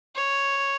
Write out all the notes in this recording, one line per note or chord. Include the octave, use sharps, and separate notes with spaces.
C#5